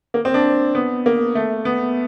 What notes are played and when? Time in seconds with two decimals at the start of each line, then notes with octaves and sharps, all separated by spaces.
0.14 A#3
0.25 C4
0.34 D4
0.75 B3
1.06 A#3
1.35 A3
1.65 B3